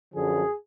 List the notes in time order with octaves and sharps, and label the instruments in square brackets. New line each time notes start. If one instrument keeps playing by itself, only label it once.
[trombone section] F#2 D3 F3 G#4